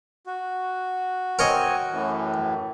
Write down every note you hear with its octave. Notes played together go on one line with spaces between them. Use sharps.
F#4
C4 A#4 C#5 D#5 G#5
F#2 A2 E3